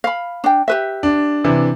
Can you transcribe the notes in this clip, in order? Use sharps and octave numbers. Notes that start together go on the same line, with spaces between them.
F5 B5
D4 G5
G4 B4 E5
D4
C3 E3 D4